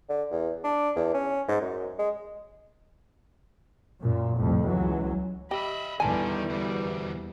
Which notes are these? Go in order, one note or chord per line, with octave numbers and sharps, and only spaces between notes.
D3
E2
D4
E2
C#4
G#2
F#2
G#3
F#2 A#2
C2 F2 A2
C#2 E3 F#3
G4 D#5 E5 B5
E2 D3 D#3 G3 G#5 A5
D2 B2 G3